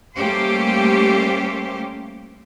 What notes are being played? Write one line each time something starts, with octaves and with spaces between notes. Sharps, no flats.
G3 A3 A#3 C#4 G4 C5